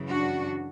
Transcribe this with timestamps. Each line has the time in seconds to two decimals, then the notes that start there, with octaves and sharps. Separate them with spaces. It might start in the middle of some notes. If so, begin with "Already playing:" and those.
Already playing: F#2 C#3 E3
0.09 D4 F#4